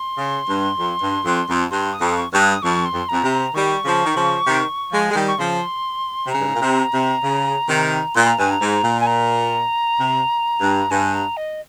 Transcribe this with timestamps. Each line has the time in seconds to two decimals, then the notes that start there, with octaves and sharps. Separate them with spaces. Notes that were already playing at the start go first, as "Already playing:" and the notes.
Already playing: C6
0.18 C#3
0.48 G2
0.78 F2
1.02 G2
1.25 F2
1.48 F2
1.71 G2 C6
1.93 D#6
2.01 F2
2.16 C#6
2.32 G2 C#6
2.39 D#6
2.62 F2 C#6
2.85 C6
2.93 F2
3.09 F2 A#5
3.23 C3
3.32 A#5
3.54 D#3 G3 C#6
3.85 C#3 F3
4.05 D#3
4.15 C#3 F3
4.46 C3 D#3
4.92 F3 G#3
5.10 G#3
5.15 D#3 G3
5.28 C#6
5.38 C#3 F3 C6
6.26 C3
6.31 C#3 A#5
6.40 G2
6.47 G#2
6.54 A#2
6.61 C3
6.93 C3
7.23 C#3
7.68 C3 D#3
8.15 A#2 C6
8.27 A#5
8.38 G2 G#5
8.51 A#5
8.61 G#2
8.84 A#2
9.00 G#5
9.07 A#5
9.99 C3
10.61 G2
10.91 G2 G#5
11.14 A#5
11.37 D#5